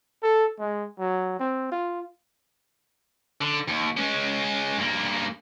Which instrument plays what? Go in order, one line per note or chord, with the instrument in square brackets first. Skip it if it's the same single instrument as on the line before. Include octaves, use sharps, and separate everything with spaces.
[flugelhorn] A4
G#3
F#3
C4
F4
[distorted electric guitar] D3
D#2
G#3 C#4
G2 A#3